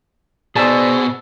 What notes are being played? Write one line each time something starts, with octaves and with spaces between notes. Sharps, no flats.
B2 G#4 C5 D5 A5 E6